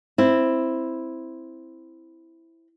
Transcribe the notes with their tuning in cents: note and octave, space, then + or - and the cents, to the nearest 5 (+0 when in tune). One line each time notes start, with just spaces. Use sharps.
C4 +0 E4 +0